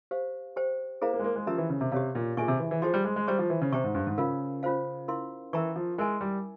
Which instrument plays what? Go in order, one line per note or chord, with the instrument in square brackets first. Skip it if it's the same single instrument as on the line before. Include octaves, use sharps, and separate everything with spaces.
[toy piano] G4 C5 F5
G4 C5 G5
[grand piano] A#3 [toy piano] E4 G#4 C5 F5 A#5
[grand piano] A#3
G#3
A#3
G#3
[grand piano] F3 [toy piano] C#4 G4 A#4 E5 A#5
[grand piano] E3
C#3
C3
[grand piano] C3 [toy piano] G4 C#5 F5
[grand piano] A#2
[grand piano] A#2 [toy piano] G#4 E5 G#5 C#6
[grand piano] C3
E3
E3
[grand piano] F3 [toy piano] G#4 C5 G5 C6
[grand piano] G3
G#3
G#3
[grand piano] G3 [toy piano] C5 E5 A#5 C#6
[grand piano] F3
E3
C#3
[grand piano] C3 [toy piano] C5 G5 A#5 C#6
[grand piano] G#2
G2
G#2
[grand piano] C#3 [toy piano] F4 A#4 F5
[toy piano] C#4 F4 C5 F5
E4 A#4 F5 C6
[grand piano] E3 [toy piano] A#4 E5 G5 A#5 C#6
[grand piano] F3
[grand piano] G#3 [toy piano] E4 A#4 E5 G#5
[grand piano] G3